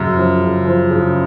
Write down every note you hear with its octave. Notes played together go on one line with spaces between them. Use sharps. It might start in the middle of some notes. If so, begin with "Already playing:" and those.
Already playing: F#2 C#3
F3
C#3
F3
C#3